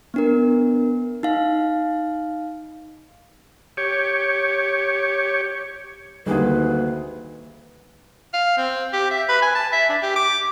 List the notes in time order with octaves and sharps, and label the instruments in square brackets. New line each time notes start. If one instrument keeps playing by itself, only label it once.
[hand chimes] B3 D4 A#4
D#4 F5
[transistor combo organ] G4 C#5
[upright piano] D2 D#3 [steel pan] G3 G#4 [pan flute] A#3 [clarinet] B4
[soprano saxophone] F5
C4
G4
E5
B4
G#5
A5
E5
D4
G4
D6